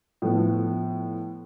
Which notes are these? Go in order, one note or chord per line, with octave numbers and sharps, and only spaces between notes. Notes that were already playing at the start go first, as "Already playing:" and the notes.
A2 F3 B3